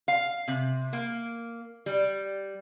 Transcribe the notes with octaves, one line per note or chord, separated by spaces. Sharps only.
F5
C3
A#3
G3